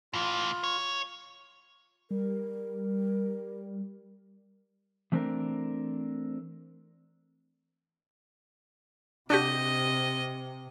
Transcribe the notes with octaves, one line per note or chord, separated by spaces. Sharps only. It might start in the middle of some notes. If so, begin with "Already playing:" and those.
A2 E3 F4
C#5
G3 A#4
E3 A3 C4 D4 A#4
C3 D4 F#4 G4 D#5